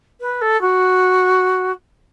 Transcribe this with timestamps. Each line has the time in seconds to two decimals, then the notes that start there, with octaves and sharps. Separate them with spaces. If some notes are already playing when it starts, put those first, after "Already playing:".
0.20 B4
0.41 A4
0.61 F#4